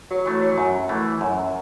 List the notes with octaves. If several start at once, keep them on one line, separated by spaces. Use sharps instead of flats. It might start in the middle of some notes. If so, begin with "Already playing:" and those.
F#3
E3 A3
F#3
F#2
E3 A3
F#2